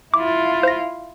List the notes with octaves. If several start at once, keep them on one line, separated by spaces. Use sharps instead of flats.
E4 F4 D6
C5 A#6